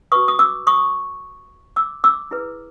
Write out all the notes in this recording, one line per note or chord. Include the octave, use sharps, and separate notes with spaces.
F#4 B4 C#6 D#6
D#6
D6 E6
C#6 D#6
D6 E6
D6 E6
E4 G#4 B4